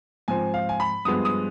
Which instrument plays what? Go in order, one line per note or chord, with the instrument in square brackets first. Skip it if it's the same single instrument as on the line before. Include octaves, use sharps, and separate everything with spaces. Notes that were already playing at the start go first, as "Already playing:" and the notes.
[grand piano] G#2 F3 C4 G#5
F5
G#5
B5
G2 F3 G#3 B3 D#6
D#6